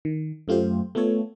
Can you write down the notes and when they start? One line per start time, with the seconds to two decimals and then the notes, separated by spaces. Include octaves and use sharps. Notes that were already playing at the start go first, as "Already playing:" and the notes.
0.05 D#3
0.48 F#2 A3 F4 G4 C5
0.95 A3 B3 F4 A4 C#5